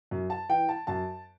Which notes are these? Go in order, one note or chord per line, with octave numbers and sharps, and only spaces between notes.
F#2
A5
E3 G5
A5
F#2 A5